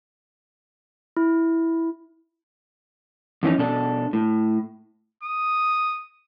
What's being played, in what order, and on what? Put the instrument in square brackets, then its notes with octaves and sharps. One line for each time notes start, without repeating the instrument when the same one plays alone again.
[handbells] E4
[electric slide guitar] F2 E3 C#4 D#4
B2 D4 A4
A2
[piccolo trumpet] D#6